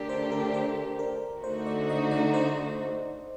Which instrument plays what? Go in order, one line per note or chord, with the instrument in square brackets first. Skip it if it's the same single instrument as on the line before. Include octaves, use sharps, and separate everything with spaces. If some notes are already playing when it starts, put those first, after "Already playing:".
Already playing: [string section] D3 A3 D4 G4 [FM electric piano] A#4 D5
[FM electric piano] C5
A#4
C5
A#4
[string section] D3 A3 D#4 F#4 [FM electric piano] C5
[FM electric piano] D5
D#5
D5
C5